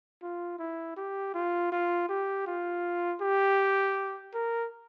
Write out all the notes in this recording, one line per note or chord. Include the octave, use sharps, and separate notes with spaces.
F4
E4
G4
F4
F4
G4
F4
G4
A#4